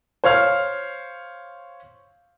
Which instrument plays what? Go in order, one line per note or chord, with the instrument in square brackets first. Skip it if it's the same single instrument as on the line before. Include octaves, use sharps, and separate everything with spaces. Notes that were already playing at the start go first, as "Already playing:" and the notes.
[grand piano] C5 C#5 F5 F6